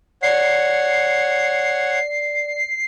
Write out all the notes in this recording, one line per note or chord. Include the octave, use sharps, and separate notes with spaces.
C#5 D5 F#5 C7